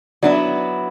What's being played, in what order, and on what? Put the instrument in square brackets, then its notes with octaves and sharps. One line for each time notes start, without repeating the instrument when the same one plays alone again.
[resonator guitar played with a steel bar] F#3 B3 E4 [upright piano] D4 D5